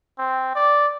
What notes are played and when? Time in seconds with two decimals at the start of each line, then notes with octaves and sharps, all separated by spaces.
0.19 C4
0.55 D5